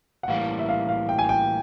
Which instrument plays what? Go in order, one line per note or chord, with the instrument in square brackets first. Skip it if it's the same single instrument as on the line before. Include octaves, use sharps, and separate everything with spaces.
[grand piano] F#5
[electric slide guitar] A2 E3 G3 A#3 [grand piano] F5
[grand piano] E5
F5
F5
G5
G#5
G5